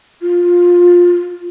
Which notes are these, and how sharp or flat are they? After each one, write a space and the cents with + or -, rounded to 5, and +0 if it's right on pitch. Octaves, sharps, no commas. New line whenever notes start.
F4 +10